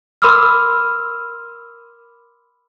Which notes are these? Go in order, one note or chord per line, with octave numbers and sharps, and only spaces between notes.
A#4 B5 C6 D6 E6 F6